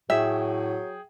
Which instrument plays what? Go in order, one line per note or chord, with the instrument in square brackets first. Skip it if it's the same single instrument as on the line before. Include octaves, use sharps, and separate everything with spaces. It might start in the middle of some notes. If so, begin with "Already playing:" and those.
[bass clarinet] A2 [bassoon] F#3 [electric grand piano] G#4 G5 [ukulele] E5